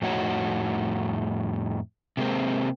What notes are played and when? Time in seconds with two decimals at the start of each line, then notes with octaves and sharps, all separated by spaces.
0.02 F2 A2 D#4 F#4 C#5
2.17 C3 G#3 A#3 C4